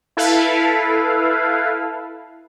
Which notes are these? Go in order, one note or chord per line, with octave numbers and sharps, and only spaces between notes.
E4 A4 B4 F5